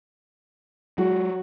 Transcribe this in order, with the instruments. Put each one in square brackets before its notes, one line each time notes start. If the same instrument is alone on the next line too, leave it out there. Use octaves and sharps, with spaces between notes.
[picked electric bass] F#3 G#3 [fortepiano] F#4